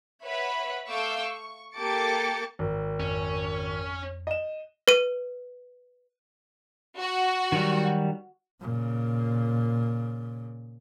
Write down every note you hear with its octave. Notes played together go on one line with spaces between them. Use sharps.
B4 C#5 E5 F#5 B5
A3 F5 C#6 D6 E6 G6
C#6
A#3 G4 A4 D6 A6 C#7
G#1 A#4
F2 C#4
D#5 E7
B4 D#7
F#4
D#3 F#3 G3
A#2 C#3